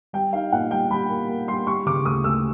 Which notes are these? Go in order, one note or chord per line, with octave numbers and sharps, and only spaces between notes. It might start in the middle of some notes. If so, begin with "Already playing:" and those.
G3 G5
D#4 F5
A#2 F#5
G3 G5
G3 B5
A#3
A#3
G3 C6
G3 C#6
C#3 D6
D2 D#6
D2 E6